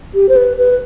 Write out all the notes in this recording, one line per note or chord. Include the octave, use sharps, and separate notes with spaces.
G4
C5
B4
B4